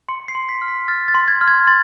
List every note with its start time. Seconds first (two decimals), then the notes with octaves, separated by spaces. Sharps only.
0.09 C6 C#7
0.28 C7
0.35 C6
0.49 B6
0.62 F6
0.68 B6
0.88 F6 A6
1.08 A6
1.15 C6
1.28 G#6
1.41 F6
1.48 G#6
1.67 C6 A6